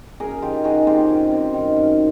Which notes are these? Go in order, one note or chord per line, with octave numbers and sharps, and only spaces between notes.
F#2 G#4 A#4
D#3 F4 G4
D#3 F#4 G#4
C4 F4 G4
F#2
C4
D#3
F#2